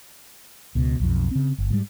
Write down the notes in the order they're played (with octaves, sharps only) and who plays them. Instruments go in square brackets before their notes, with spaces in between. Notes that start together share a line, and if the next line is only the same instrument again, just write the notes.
[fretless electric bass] C#2 B2
B1 F2
C#3 C4
G1
G#2 E3 G3